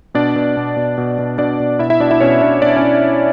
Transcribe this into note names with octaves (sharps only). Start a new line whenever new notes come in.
B2 D4 D5
B2
B2
B2
B2
B2
B2 D4 D5
B2
B2 E4 E5
E4 E5
B2 D4 D5
E4 E5
B2 C#4 C#5
B2 D4 D5
B2 D4 D5
C#4 C#5
B2